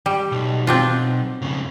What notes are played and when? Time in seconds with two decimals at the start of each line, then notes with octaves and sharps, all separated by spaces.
0.06 G3
0.32 B1
0.67 C4 D4 F4
1.42 F2 C#3